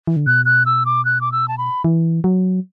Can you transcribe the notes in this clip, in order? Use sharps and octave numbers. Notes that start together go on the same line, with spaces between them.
E3
D3
B2 F#6
F#6
E6
D6
F#6
D6
E6
A5
B5
E3
F#3